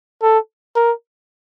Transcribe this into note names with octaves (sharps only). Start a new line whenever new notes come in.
A4
A#4